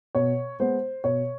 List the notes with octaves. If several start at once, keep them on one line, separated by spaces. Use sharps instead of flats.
B2 C#5
G#3 B3 C5
B2 C#5